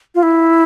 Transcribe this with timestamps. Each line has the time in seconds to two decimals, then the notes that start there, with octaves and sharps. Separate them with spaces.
0.15 F4
0.23 E4